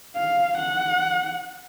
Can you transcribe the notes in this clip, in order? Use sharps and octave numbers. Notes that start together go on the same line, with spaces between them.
F5
F#5